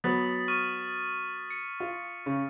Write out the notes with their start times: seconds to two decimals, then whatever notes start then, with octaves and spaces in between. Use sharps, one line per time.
0.04 F#3 B3 D#6 A6 B6
0.48 C#6 F6 D#7
1.51 C#7
1.80 F4
2.26 C#3